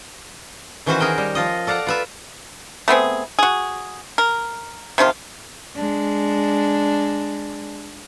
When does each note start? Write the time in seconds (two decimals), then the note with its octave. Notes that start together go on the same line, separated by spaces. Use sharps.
0.86 D#3 E3 C#4 F#4 B4 C5
1.00 F#4 G#4 A#4 G5
1.18 G3
1.35 F3 F4 D#5
1.67 A4 D5 F5 F#5 A#5
1.87 F4 B4 E5
2.88 A3 B3 C4 G#4
3.39 F#4 G#4
4.18 A#4
4.98 C3 D#3 F3 F4
5.76 G#3 D4